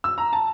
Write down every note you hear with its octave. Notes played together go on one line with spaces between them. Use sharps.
E6
A#5
A5